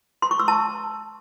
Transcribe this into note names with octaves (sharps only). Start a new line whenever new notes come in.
C6
C#6
E6
A5